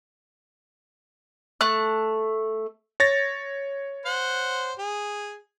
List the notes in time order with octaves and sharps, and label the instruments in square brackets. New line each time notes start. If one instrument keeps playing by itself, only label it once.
[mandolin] A3 F#6
[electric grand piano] C#5 A6 A#6
[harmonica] C5 F#5
G#4